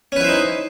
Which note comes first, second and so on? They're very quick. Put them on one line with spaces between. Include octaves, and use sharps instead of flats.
C#4 B4 E4 C5 D#4